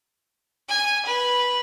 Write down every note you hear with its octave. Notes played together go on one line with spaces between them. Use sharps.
G#5
B4